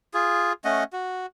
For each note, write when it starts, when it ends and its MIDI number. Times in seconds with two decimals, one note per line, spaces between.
0.14 0.53 65
0.14 0.53 68
0.65 0.84 57
0.65 0.84 61
0.65 0.84 75
0.65 0.84 78
0.93 1.26 66